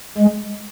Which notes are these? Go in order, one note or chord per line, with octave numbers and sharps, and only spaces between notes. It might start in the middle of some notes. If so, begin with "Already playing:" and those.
G#3